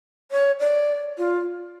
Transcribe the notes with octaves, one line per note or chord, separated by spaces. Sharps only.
C#5
D5
F4